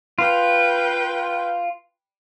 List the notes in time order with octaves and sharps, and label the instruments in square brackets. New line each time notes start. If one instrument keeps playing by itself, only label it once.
[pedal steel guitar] F4 [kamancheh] B4 G5